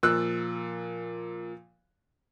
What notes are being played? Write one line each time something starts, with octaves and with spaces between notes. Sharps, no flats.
A#2 F3 E6 F#6